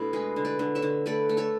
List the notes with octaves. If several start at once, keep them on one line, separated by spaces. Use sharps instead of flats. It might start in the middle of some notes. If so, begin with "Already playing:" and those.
Already playing: B2 A3 D4 E4
G#3 G#4 B4
D3
B4 D5
D3
C#5 E5
D3
A3 B4 D5
A3
A4 C#5